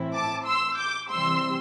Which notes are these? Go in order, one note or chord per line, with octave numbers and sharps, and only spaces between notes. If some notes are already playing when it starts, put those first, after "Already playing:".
Already playing: A2 E3 C4 E4
A5 D6
C6 E6
D6 G6
C3 E3 G3 C4 C6 E6